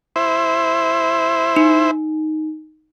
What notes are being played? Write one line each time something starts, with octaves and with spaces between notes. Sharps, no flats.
E4 C5
D#4